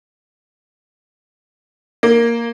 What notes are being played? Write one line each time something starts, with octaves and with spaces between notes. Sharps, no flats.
A#3